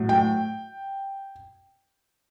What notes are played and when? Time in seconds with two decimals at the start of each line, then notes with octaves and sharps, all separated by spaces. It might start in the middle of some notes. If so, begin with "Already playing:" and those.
Already playing: A2 F#3
0.09 G5